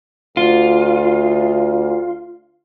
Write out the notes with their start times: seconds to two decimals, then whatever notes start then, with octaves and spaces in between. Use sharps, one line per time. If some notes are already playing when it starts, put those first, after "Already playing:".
0.37 D2 F4